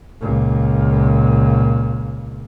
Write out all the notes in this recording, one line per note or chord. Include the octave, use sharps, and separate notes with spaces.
C#2 A#2